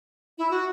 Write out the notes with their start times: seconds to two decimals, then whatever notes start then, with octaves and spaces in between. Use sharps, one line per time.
0.38 E4
0.51 F#4